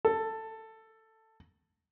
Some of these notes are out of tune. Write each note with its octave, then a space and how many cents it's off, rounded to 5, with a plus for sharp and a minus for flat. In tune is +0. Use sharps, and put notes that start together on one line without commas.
A4 +10